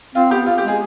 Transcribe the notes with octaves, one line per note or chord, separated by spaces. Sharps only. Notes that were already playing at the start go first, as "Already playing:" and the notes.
C4 F4
B3 G4
F4
G4
G#3 G#4